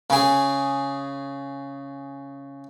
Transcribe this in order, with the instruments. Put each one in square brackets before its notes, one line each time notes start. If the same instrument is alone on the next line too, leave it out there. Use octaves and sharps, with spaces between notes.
[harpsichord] C#3 G#4